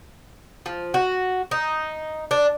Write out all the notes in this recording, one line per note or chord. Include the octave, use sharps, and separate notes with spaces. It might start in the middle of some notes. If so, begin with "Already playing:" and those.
F3
F#4
D#4
D4